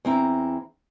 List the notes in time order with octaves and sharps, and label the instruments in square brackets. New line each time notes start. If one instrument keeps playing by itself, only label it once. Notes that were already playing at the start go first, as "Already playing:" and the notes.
[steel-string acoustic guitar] E2 C4 E4 A#5